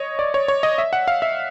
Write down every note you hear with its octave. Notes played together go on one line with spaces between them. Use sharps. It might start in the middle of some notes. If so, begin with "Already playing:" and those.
Already playing: C#5 D#5
D5
C#5
C#5
D#5
E5
F#5
F5
E5